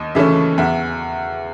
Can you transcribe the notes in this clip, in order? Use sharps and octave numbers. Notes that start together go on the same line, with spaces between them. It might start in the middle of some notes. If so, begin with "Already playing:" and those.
Already playing: D#2 D#5
C#3 E3 A3 C#4 E5
E2 E5